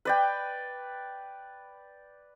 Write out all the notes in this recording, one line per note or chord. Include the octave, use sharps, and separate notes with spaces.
B4 D5 G5